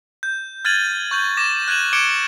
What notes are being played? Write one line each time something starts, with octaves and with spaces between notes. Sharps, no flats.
G6
F6 G#6 A6 D#7 F#7
C#6 G6 F#7
D6 A#6 E7
F#6 G#6 D#7 E7 F#7
D6 G#6 C#7 D7 E7 G7